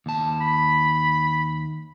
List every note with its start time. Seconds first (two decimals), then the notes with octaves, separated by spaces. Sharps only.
0.06 D#2 A5
0.41 B5